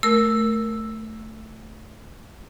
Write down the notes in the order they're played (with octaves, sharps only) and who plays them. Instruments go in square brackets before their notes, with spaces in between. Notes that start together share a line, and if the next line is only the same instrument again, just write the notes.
[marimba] A3 A#4 [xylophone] E6